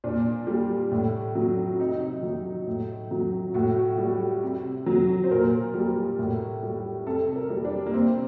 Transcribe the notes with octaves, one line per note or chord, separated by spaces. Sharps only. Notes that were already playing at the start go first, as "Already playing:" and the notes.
A#2 D4
G3
A2
F#3
C3 D#4
F#3
A2
F#3
A2 F#4
G3
C3
F#3
C5
A#2 A#4
G3
A2
G3
C3 A4
A#4
G3
D4
A#3
C3 C4